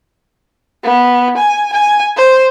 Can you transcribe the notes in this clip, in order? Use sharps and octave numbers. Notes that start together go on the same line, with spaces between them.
B3
G#5
G#5
C5